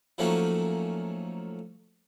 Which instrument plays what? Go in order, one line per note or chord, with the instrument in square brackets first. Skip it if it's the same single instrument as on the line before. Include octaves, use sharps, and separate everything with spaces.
[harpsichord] F3 F#3 A3 A#3 C#4 D#4